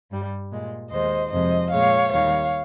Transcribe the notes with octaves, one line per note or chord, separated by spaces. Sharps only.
G2 G3
A#2 G#3
D#2 D#3 G#3 C5 D#5
F2 C3 F3 G#3 C5 D#5
A#2 G#3 C#5 F5
D#2 D#3 G3 C#5 F5